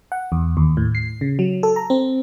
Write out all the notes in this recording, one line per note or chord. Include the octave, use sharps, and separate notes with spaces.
F#5
E2
D#2
A2
C7
C#3
F#3
A4
A#5
C4